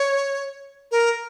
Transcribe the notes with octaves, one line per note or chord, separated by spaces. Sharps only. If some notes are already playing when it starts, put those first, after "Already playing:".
Already playing: C#5
A#4